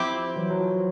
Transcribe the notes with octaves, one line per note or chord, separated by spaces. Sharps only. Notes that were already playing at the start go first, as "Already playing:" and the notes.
Already playing: F3 C4 E4 G4
F3
E3 F#3
F#3
F3